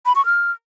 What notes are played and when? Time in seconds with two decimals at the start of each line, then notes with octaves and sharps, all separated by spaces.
0.06 B5
0.15 C#6
0.25 F6